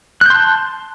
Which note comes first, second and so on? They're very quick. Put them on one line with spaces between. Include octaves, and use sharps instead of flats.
F#6 G6 C6 A5